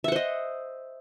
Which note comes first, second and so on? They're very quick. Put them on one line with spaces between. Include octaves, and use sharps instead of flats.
E5 F#5 C5 D#5